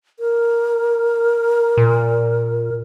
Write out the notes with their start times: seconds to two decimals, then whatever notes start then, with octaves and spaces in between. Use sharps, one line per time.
0.19 A#4
1.77 A#2